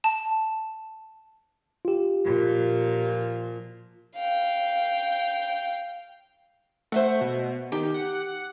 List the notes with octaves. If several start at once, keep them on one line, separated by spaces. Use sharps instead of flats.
A5
F4 G4
A#2 F3
F5 G5
A3 C5 E5 F#5
B2
D#3 G4
F#5